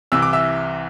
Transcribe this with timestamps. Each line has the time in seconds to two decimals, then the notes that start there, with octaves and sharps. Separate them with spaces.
0.12 C2 C3 E3 E6
0.22 D6
0.33 E5 E6